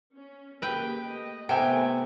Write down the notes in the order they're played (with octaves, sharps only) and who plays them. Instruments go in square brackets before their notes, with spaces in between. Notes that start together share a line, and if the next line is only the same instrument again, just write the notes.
[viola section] C#4
[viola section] A#3 G4 G#4 [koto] B4 G5
[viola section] A3 D#5
[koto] C3 [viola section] D#3 A3 B3 [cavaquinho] G5 G#5